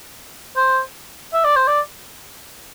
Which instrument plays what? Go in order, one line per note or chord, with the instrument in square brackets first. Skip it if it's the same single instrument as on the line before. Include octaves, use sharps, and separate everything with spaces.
[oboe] C5
E5
D5
C5
D5